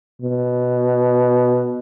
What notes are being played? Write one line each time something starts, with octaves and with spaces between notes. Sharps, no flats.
B2